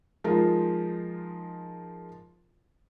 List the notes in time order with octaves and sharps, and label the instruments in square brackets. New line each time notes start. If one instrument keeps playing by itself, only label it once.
[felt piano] F3 G#3 D#4 F4 A#4